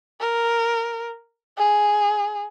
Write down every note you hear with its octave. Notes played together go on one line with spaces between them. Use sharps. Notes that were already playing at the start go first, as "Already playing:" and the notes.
A#4
G#4